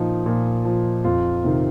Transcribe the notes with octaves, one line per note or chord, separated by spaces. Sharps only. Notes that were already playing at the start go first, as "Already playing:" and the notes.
Already playing: A#2 F3 D#4
A#2
F3
F2 F4
C3 D#3